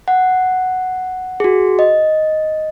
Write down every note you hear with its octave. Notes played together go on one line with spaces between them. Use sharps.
F#5
F#4 G#4
D#5